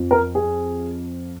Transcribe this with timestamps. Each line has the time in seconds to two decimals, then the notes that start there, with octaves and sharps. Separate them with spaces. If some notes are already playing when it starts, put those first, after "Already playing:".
Already playing: F2 F3
0.11 A#4
0.35 G#4